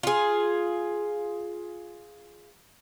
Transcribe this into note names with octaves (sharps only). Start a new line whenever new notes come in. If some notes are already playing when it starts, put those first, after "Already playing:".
F4 G#4